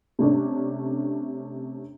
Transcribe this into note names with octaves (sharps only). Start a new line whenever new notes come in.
C3 A3 C#4 D4